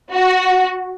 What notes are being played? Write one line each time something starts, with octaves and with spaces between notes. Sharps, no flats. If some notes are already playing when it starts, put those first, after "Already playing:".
F#4